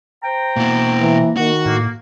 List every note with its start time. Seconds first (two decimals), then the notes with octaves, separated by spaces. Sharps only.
0.23 C5 G5 A#5
0.57 B2 A#3 E4
1.01 E3
1.37 D#3 F#4
1.66 A2 A#3